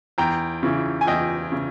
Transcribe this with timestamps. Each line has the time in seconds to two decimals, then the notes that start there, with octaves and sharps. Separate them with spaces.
0.18 E2 G5 A#5
0.63 C#3 E3
1.01 G#5
1.07 E2 D#5 G5
1.52 C#3